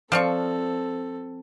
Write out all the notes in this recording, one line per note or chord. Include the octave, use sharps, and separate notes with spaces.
F3 C4 A4 D5 F5 C#6